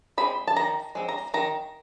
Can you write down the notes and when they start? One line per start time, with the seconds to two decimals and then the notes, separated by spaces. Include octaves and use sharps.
0.18 G#3 C4 B5
0.48 A5
0.56 D#3 A#5
0.95 G#3 C4
1.09 A#5
1.34 D#3 A#5